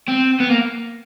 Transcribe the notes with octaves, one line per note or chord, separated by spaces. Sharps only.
C4
B3
A#3